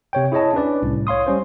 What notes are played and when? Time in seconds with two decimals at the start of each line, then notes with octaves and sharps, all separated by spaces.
0.13 C3 C#5 G5
0.32 E4 G#4 C#5 D#5 A5
0.54 C#4 D4 B4 D5
0.83 C2 A2
1.07 C#5 F5 C6 D#6
1.27 G3 C#4 C5